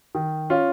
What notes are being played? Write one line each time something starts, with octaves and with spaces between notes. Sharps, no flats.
D#3
C#4 F4